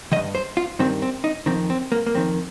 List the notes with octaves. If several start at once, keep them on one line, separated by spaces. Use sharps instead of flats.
D#3 D#5
G2
C5
F4
G2 D#3 C4
C4
D#4
F2 D#3 C4
C4
A#3
A#3
F2 D#3 C4